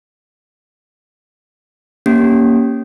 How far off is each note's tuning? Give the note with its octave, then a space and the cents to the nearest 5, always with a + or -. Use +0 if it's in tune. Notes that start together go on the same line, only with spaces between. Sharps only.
A#3 +0 C#4 +0 G4 -10